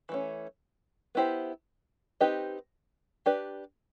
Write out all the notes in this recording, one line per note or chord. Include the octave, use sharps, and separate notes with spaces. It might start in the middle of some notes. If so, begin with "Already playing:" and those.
E3 A3 C#4
B3 E4 G4 C5
C4 D#4 G4 B4 D#5
D4 G4 B4 D5